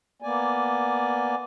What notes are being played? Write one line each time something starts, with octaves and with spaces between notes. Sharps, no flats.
A#3 B3 D5 G#5